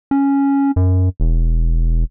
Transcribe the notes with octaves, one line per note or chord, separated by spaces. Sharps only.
C#4
F#2
E1